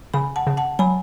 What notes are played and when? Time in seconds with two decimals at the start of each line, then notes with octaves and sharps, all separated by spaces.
0.14 C#3 G#5 B5
0.36 F#5 A5
0.47 C#3
0.57 F#5 A5
0.79 F#3 G#5 B5